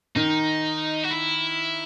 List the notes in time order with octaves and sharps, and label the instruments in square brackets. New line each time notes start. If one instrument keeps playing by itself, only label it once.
[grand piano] D#3 [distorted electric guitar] D#4
[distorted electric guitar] F#4
E4